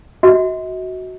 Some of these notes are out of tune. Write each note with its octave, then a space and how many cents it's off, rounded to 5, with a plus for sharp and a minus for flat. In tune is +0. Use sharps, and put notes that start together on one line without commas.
F#4 +0 D#5 +45